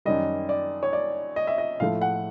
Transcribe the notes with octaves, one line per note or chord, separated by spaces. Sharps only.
F#2 D#3 G3 D#5
D5
C#5
D5
D#5
E5
D#5
A2 F3 A3 F5
F#5